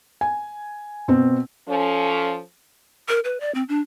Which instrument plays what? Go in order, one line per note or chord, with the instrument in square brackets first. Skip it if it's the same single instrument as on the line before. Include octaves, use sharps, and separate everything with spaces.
[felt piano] G#5
B2 C4
[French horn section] F3 C#4 A4
[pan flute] A#4
B4
D5
C4
D4